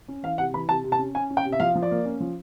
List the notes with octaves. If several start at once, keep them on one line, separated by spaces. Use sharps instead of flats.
C#4
E3 F5
C3 F#5
E3 B5
C3 A5
C3
A5
C#4
C#4 G#5
C#4
G5
C3
E5
F3 F5
F3
D5
A#3
C#4
F3